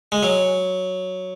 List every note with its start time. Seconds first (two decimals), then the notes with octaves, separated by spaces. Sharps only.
0.12 G#3
0.23 F#3